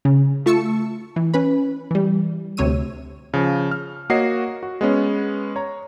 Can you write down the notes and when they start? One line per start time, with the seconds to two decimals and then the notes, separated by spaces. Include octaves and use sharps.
0.05 C#3
0.46 A3 F4 A5 C#6 E6 C#7
1.16 E3
1.34 C#4 B4 B5
1.91 E3 G3
2.57 D2 C3 C#5 E6 D#7
3.34 C#3 F3
3.71 F6
4.10 A#3 F#4 C#5 D#5 C7
4.63 F#4
4.81 G#3 B3 C#4
5.56 C#5 A#5